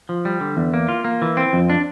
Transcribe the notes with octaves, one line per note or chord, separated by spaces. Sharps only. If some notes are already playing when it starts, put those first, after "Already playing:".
F3
G3
D3
E2
A#3
F4
A#3
E3
C4
F2
D4